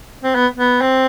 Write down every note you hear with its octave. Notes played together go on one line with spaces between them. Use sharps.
C4
B3
B3
C4